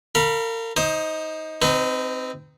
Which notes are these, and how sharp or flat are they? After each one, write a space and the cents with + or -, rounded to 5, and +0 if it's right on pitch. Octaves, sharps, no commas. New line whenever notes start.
A#4 -40 F5 +0 B5 -25
D#4 +20 C5 +20 D#6 -20
C4 +0 D#4 +5 B4 +45